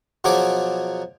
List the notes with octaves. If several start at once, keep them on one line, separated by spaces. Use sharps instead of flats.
B2 F3 F#3 G#4 G#5 D6